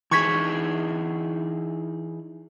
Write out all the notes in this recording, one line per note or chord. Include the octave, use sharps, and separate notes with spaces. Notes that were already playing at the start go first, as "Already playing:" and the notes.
E3 D#4 G#4 C#6 G#6 B6